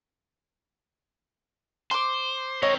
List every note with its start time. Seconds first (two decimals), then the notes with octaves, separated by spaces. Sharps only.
1.91 C5 C6 D6
2.63 C4 A#4 C#5 D#5